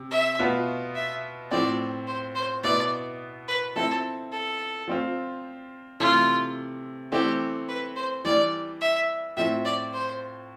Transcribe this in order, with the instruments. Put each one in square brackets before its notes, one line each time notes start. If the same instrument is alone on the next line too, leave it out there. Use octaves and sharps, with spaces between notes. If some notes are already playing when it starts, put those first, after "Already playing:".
Already playing: [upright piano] C3
[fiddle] E5
[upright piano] B2 B3 F4
[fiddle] E5
[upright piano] A2 F3 C4 [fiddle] D5
[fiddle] C5
C5
[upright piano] B2 B3 E4 [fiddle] D5
[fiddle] B4
[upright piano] F3 C4 E4 [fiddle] A4
[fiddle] A4
[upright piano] F3 C4 F4
[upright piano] C3 E3 A3 [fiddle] F4
[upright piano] E3 A3 C4 [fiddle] G4
[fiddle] B4
C5
[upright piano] E3 G3 D4 [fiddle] D5
[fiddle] E5
[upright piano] A2 F3 C4 [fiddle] E5
[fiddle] D5
C5